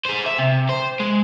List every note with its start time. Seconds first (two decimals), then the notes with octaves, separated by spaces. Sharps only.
0.05 G#4 C5
0.26 E5
0.38 C3
0.69 C5
1.00 G#3